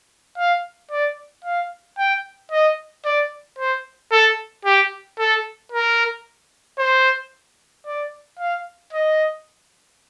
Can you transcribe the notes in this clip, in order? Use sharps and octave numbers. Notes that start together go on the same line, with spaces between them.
F5
D5
F5
G5
D#5
D5
C5
A4
G4
A4
A#4
C5
D5
F5
D#5